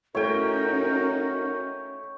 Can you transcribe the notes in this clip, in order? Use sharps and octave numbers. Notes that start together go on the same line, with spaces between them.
A3 C#4 D#4 E4 F#4 A#4 C#5 G5